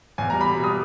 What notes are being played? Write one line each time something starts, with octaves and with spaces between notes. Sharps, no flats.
E2 G#5
G3 A#5
B5
B2
G3 D#6